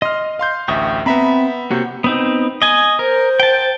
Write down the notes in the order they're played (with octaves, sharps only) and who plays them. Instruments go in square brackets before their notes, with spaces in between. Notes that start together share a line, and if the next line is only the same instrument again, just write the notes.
[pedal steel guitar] D#5 [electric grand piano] C6 F6
[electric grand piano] F5 C6 G6
[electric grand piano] A1 D2 E5 [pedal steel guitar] G5 C#6 D#6
[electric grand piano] B3 E5 A#5 [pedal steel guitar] C4 B5
[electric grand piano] C3 G6 [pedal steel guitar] A#3 F#4 C#5
[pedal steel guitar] B3 C4 D#4
D#5 G#5
[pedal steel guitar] A#4 [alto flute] C5
[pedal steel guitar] G5 A5